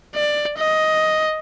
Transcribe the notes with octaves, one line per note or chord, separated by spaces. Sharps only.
D5
D#5